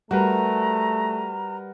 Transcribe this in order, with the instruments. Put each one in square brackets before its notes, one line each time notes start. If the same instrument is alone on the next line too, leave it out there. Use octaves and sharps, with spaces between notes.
[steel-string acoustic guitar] G3 [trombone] A3 [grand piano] F#4 A#4 B4 [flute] A#5